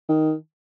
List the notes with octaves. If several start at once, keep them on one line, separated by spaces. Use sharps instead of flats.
D#3